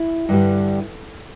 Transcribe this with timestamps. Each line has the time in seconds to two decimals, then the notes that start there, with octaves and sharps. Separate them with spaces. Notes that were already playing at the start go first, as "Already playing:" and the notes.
Already playing: E4
0.29 G2 D3 G3